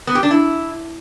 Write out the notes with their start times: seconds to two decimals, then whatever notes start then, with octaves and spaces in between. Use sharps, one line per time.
0.07 B3
0.15 G4
0.23 D4
0.31 E4